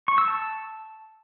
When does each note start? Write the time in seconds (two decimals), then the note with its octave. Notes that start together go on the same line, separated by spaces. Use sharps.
0.08 C#6
0.18 E6
0.28 A5